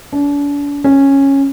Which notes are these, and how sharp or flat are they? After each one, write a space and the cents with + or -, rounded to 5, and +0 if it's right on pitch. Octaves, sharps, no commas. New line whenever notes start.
D4 -40
C#4 -10